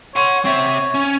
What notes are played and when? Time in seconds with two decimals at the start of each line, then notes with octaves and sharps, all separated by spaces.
0.16 C#5 F#5 C6
0.45 C4 C#5 E5
0.94 C#4